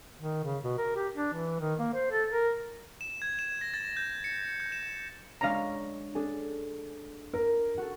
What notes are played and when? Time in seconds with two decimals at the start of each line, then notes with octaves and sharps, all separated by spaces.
0.21 D#3
0.44 C#3
0.64 B2
0.78 A#4
0.96 G4
1.15 D4
1.33 E3
1.60 D#3
1.79 A#3
1.93 C5
2.11 A4
2.30 A#4
3.01 E7
3.22 G#6
3.39 E7
3.61 A#6
3.74 A6
3.97 G6
4.24 C#7
4.60 G6
4.72 E7
5.41 G#3 D4 C#5 F5 A#5
6.15 D4 G#4 A4
7.33 A#4
7.78 F#4 A4